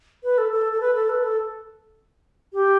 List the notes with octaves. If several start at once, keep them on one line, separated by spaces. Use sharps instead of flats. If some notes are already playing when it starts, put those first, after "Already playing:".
B4
A4
A4
A4
B4
A4
B4
A4
G4